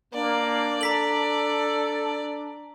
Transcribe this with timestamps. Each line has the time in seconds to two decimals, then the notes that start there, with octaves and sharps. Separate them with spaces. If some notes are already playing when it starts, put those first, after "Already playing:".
0.14 A#3 D4 D5
0.81 A4 A#5 B6 F#7